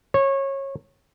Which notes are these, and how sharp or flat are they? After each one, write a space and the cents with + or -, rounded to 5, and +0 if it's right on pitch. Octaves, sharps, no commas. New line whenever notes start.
C#5 -20